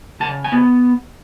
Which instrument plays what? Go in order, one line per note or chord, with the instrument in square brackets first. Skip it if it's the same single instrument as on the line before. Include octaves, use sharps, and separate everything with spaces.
[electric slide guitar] C#3 A5
G#5
B3